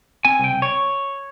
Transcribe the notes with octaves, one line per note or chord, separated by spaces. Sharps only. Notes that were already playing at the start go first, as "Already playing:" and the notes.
C4 G#5
C2
G5
C2
C#5